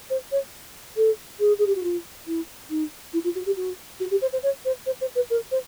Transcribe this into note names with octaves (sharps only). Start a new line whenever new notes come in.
C5
C#5
A4
G#4
G#4
G4
F#4
F4
E4
D#4
E4
F4
F#4
G4
F#4
F#4
G4
C5
C5
C#5
C5
C5
C5
B4
A#4
C5